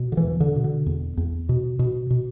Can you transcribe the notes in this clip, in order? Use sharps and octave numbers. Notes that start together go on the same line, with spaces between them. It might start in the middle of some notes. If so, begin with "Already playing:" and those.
Already playing: B2
D3
E3
E2
D3
B2
D3
E2
E2
B2
B2
B2